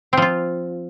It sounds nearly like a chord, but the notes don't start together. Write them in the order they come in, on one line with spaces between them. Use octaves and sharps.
C4 F3 F4